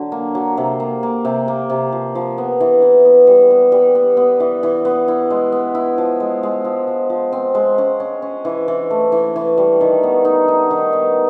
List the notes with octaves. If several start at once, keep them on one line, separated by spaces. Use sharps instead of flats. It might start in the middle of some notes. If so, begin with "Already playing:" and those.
Already playing: D3 F#3
A#3
F#3
C3
A#3
A#3
C3
A#3
C3
F3
F3
B3
E3
E3
B3
G3
B3
G3
B3
B3
E3
E3
B3
E4
G#3
B3
E4
F3
G#3
G#3
F3
F3
F3
C4
G#3
C#4
C#4
C#4
E3
E3
A3
E3
E3
G3
D#3
B3
D#4
D#4
D#3
B3